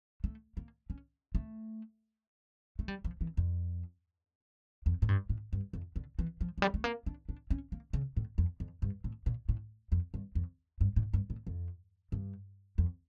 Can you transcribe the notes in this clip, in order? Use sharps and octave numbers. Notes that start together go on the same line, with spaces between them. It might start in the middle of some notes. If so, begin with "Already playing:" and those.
A3
A#3
C#4
A3
A3
G3
F3
E3
F2
F2
A2
G2
A2
G2
F2
D3
E3
F3
F3
G3
A3
A#3
D4
D4
C#4
A#3
C#3
A2
F2
F2
G2
A2
A#2
A2
F2
G2
F2
G2
A2
G2
A2
F2
G2
F2